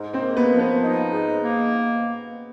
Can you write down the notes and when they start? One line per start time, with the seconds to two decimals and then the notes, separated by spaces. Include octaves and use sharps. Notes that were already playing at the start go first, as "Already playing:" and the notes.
Already playing: G#2
0.14 C4 C5
0.21 A#3
0.37 B3 B4
0.52 F3
0.59 B3 B4
0.82 D#4
1.12 G#2
1.42 A#3